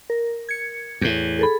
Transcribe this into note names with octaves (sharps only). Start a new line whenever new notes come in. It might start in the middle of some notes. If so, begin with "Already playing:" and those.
A#4
G#6 C#7
E2 A2
G#4 A4 B5